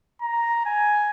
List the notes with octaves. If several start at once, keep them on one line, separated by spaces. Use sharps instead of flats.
A#5
G#5